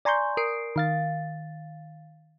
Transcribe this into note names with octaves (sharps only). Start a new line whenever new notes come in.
D5 G#5 A#5 C6 C#6 G6
A#4 D#6 C7 D7
D#3 F5 A6